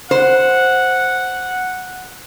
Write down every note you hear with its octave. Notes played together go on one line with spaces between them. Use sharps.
C5 F#5